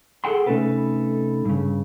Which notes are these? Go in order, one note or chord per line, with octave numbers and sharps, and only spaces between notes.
G#4 A4 F#5 G5 C6
C3 A3 C#4 D#4 A4 B4
G2 C#3